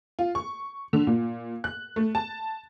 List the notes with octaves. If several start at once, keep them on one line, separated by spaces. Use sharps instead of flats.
F4
C#6
D3
A#2
F#6
A3
A5